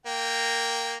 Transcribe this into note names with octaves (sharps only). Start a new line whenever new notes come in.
A#3 G5